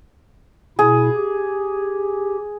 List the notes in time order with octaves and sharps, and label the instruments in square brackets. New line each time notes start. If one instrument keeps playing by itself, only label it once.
[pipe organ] B2 E4 [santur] G#4
[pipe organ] G4